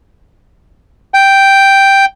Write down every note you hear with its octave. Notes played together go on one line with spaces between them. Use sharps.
G5